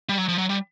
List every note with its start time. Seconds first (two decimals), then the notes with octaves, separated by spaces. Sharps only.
0.09 G3
0.18 F#3
0.29 F3
0.38 F#3
0.49 G3